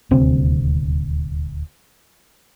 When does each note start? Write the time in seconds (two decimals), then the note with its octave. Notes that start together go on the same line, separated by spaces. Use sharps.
0.11 D#1 D2 C3 C4